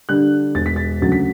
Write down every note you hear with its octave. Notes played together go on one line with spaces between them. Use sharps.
D3 G3 D4 F#6
E1 A6
B6
A6
D2 C#3 F#3 A6
B6